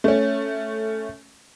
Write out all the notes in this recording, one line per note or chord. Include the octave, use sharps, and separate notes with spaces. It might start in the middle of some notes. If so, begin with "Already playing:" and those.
A3 C#4